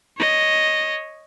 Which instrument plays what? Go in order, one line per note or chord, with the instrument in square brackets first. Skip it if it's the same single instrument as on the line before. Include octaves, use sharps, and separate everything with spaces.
[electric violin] C#5 D#5